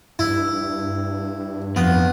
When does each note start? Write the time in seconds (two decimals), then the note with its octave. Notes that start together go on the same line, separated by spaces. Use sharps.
0.19 G2 E4
1.76 F2 B3